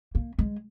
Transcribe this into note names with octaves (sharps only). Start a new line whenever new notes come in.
A#3
G#3